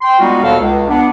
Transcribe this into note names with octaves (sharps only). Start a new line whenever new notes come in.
G5 C6
G3 G#3 B3 D#4 F4 F#4
D#2 B2 B3 A4 A#4 F5
C#2
B3 D4